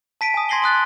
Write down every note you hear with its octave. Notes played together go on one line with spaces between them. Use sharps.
A5 B6 D7 D#7
G#5 D#6
C6 G#6 A#6 C7 F#7 G7
C6 D#6 F#6 A6